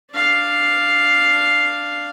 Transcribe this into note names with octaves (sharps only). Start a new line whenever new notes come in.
D4 F5